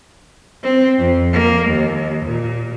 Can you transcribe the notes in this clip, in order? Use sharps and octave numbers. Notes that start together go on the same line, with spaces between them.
C4
F2
A#3
D#2
A#2